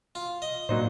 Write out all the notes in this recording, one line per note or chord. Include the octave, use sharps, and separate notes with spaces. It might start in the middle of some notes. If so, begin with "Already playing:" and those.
F4
D#5
A2 F#3 A#3 D#4 C5 D5